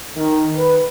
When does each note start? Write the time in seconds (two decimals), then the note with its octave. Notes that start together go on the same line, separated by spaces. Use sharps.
0.15 D#3
0.56 B4